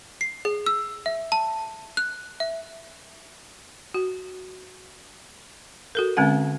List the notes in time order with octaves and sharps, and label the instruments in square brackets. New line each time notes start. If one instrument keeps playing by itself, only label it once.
[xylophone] C7
G#4
E6
E5
A5
F#6
E5
[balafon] F#4
F#4 A4 A#4
D3 G#3 C4 C#4 F#5